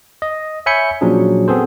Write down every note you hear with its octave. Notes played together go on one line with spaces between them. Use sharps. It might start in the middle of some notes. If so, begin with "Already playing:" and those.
D#5
C#5 E5 G#5 B5 G6 C#7
A#2 F3 F#3 C#4 D4 G#4
B3 C4 G#4 A4 C5